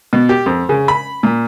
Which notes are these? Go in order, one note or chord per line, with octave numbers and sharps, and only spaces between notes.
B2
G4
F2
C#3
B5
A#2